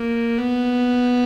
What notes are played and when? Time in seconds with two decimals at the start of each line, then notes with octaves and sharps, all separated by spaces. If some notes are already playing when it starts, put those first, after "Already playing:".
Already playing: A#3
0.38 B3